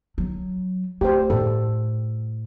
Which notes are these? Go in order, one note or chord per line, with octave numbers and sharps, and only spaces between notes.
F#3
A3 G4 C5
A2 A4